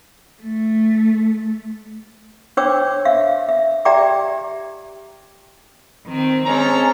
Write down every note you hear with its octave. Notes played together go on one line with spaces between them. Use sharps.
A3
D4 C5 C#5 G5 D6 E6
E5 F5
E5
G4 D5 E5 G5 A#5 D6
D#3 C4
G#3 C4 C#4 A4 C5 A#5